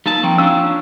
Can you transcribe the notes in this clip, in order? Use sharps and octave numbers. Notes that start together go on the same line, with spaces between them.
G3 A#3 D#4 F4 A5
F3 C4 G5 A#5 C#6
C#4 D4 F4 F5 E6